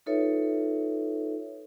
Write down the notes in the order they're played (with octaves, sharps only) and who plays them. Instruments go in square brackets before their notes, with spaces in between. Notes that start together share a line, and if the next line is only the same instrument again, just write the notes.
[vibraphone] D#4 F4 A4 B4 C#5 E5